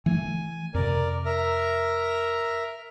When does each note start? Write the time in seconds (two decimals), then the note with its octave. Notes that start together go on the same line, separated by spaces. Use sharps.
0.06 E3 A3 G#5
0.74 F2 C3 A#4 D5
1.25 A#4 E5 A#5